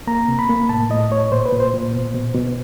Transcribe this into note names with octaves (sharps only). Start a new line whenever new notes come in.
A#3 A#5
C3
B5
A#3
A2 A5
A2 D#5
A2 C#5
A#2 C5
B4
A#2
C5
A#2
B2
B2
B2